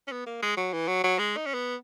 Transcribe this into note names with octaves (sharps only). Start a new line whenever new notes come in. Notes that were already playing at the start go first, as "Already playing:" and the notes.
C#4
B3
A#3
G#3
F#3
E3
F#3
F#3
G#3
D#4
C#4
B3